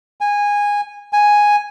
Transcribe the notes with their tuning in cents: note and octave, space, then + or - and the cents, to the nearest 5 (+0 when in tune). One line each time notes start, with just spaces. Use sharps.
G#5 -15
G#5 +0